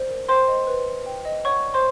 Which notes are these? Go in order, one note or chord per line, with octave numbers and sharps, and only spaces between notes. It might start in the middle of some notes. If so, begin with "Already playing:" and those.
Already playing: C5 D5
A#4
C5 G5 C6
D#5
B4
B4
G5
D#5
C#5 F#5 C#6
D5
C5 C6